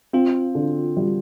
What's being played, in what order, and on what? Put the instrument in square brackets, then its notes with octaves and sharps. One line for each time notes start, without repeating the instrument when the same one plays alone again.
[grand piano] C4 [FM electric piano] F4
[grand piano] D3
G3